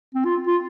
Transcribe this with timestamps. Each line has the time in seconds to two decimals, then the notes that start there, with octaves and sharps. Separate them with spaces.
0.14 C4
0.25 F4
0.47 F4